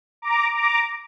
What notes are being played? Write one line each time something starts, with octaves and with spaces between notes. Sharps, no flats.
A#5 D6
A#5 D6